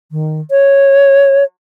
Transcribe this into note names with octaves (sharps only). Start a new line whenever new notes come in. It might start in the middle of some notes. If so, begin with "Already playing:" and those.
D#3
C#5